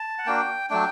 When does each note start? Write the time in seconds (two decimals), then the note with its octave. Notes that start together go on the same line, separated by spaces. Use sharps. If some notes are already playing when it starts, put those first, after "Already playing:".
Already playing: A5
0.18 F#5
0.26 A#3 D4 F#4 G5
0.70 F#3 A3 D4 G5